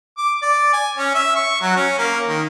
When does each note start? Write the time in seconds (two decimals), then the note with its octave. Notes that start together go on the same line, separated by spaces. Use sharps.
0.18 D6
0.42 D5
0.73 G#5
0.98 C#4
1.15 E5
1.36 C#6
1.61 F#3
1.76 C#4
1.98 A#3
2.28 D#3